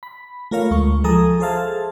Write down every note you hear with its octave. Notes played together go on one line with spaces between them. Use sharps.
B5
A3 F4 A#4 C#5 F5
D2 G#3 C#6
F3 G#4 A4 G#5 A#5 D#6
G#4 A4 C5 E5 F5 A5